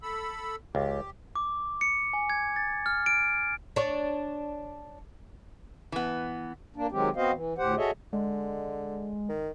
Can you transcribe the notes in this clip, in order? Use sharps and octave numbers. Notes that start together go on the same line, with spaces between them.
A4 B5 E6
C#2 G4
D6
C#7
G#5
G#6
A6
F6
D7
D4 C#5
E3 B3
A#3 D4
D#3 F#3 G#3 C4 G4
B3 C4 F#4 C5 D#5 F5
E3
D2 A2 G4 C5 F#5
F#4 G#4 A4 C#5 D#5 E5
D3 G#3
D#3